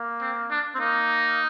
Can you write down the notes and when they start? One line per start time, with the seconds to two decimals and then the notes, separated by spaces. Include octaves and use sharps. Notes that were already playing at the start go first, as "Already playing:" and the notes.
Already playing: A#3
0.22 C4
0.51 D4
0.75 C4
0.80 A#3 D#4